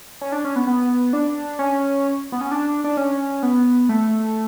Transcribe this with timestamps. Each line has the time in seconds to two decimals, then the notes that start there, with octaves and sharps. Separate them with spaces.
0.21 C#4
0.32 D4
0.45 C#4
0.56 B3
0.67 B3
1.13 D4
1.59 C#4
2.32 B3
2.41 C#4
2.51 D4
2.84 D4
2.97 C#4
3.43 B3
3.89 A3